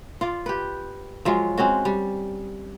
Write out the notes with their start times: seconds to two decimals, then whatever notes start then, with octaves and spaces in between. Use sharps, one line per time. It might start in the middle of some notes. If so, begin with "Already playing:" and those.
0.21 F4 D5
0.46 G4 B4
1.25 F3 F#3 G#3 F4
1.58 G#3 C4 C#4 F#4
1.85 G3